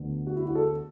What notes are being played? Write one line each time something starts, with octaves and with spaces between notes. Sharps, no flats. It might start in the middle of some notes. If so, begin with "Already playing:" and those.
Already playing: D2 D3 B3
F#4
E4
F#4
A4